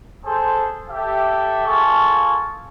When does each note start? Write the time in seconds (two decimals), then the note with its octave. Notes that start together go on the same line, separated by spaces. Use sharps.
0.25 G#4 A4 C5
0.90 G4 A4 E5
1.67 A#3 F4 G#4 A4 A5 C#6